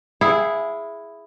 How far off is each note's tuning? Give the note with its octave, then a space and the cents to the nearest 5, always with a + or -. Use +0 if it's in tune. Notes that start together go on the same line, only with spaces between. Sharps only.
E4 +5 G#4 +0 F5 +45